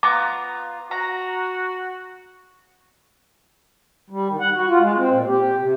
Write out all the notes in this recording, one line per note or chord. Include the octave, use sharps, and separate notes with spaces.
B3 F4 A#5 D6
F#4 A#5
G3
D#3
F#5
F#4
F4
G#3
C4
A#2
G4
C3